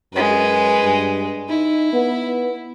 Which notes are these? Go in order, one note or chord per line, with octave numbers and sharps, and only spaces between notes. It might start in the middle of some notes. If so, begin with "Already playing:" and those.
F#2 G#3 B4
G2
D#4 E4
B3